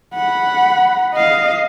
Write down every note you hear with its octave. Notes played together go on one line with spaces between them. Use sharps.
F#5 B5
D#5 F5